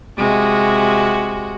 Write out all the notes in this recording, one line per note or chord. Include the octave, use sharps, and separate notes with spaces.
C3 G#3 F#4